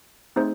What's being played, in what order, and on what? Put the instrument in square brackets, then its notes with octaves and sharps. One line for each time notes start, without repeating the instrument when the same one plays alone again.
[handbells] A3 C4 D#4 G#4 C5